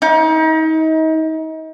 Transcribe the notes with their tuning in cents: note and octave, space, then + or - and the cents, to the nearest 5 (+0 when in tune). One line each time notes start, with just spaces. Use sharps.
D#4 +35